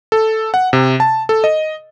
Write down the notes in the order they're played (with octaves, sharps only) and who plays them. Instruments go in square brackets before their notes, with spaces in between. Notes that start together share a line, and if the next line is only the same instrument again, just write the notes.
[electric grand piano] A4
F#5
C3
A5
A4
D#5